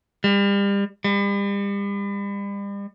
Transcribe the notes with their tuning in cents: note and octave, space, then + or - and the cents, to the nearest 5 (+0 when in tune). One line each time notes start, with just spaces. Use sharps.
G3 +35
G3 +40